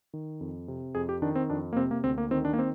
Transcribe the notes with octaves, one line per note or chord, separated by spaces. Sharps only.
D#3
F2
C3
F2 G#4
G4
D#3 D4
C4
F2 D4
A#3
C3 C4
A#3
D2 C4
A#3
D#3 C4
D4
A#3
C4